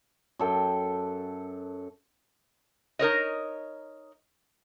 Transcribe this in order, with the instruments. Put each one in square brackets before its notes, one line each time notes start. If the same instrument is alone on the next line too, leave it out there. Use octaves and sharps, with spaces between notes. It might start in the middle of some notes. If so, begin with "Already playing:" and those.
[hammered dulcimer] F#2 A4 G5
[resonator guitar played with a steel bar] D#4 A#4 C#5 D#5